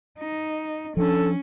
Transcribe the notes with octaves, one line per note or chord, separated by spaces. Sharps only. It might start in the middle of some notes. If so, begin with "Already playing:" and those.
D#4
F3 C#4 D4 A4